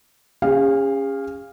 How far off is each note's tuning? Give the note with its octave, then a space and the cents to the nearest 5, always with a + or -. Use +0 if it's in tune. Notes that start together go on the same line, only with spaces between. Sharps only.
C#4 +0 G#4 -40 F5 +0